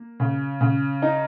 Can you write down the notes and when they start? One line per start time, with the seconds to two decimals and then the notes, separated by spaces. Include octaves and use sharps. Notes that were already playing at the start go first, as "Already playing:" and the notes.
Already playing: A#3
0.20 C#3
0.61 C#3
1.02 D#4